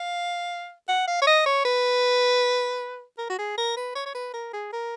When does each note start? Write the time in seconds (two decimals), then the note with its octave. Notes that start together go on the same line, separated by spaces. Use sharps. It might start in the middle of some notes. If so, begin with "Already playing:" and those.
Already playing: F5
0.89 F#5
1.07 F5
1.22 C#5
1.27 D#5
1.46 C#5
1.65 B4
3.18 A#4
3.30 F#4
3.38 G#4
3.58 A#4
3.77 B4
3.95 C#5
4.06 C#5
4.15 B4
4.34 A#4
4.53 G#4
4.73 A#4